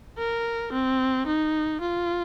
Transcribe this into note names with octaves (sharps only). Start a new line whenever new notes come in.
A#4
C4
D#4
F4